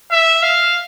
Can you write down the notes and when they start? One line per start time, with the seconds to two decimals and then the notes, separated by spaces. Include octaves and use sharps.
0.11 E5
0.43 F5